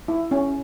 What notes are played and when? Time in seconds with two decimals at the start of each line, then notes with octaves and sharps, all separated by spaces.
0.08 E4
0.31 C#4